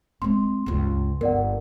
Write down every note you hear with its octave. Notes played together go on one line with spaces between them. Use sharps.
G#3 C4 C6
C#2 G2
G1 A#4 D5 F#5